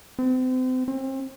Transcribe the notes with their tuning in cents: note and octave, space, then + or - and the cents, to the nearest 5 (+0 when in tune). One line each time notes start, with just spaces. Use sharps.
C4 -35
C4 +35